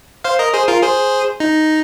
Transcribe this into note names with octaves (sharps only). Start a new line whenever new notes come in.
C5 F5
A#4 D#5
G#4 C5
F4 A#4
G#4 C5
D#4